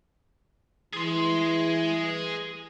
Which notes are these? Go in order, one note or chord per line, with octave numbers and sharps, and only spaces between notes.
E3 G#4 C6